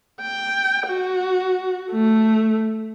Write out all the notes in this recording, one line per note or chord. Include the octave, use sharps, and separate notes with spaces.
G5
F#4
A3